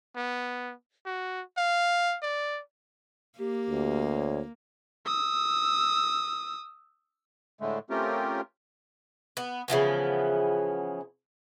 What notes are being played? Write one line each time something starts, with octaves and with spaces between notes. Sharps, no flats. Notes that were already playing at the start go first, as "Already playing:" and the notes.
B3
F#4
F5
D5
A#3 G4
D2
C#5
D#6 E6
A2 D3 G#3 A3
A3 C4 C#4 F4 G4 A#4
B3
C#3 E3 F3 B3